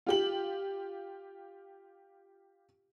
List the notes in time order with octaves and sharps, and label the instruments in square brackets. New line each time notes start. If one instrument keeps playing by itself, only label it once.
[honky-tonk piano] F4 G4 F#7